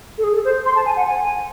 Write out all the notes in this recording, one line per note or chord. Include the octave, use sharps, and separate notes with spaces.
A4
G#4
A4
C5
C6
A5
G#5
F#5
G#5